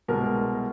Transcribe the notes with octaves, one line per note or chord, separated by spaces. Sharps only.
C2 B2 G#3 A#4